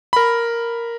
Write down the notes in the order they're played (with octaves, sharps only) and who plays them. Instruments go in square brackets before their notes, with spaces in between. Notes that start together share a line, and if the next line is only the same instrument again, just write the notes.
[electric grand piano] A#4 B5